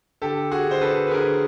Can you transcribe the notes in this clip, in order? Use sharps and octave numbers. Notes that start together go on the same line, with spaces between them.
D3 G4 A4
F#4 G#4
D3 C5
A4 B4
B4
D3 G#4 A#4